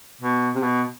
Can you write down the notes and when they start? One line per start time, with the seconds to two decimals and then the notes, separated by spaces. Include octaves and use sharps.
0.21 B2
0.55 C3
0.63 B2